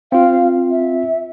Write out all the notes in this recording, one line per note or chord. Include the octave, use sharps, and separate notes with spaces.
C4 F4 F5
E5